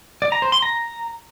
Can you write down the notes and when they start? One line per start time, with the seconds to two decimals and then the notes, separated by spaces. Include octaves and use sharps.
0.22 D5
0.32 A#5
0.42 C5
0.52 C6
0.62 A#5